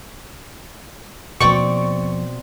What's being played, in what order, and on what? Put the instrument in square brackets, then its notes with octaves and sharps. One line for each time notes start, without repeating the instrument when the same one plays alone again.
[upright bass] D#2 F3 [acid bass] B2 [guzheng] C4 D5 G5 [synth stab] C#6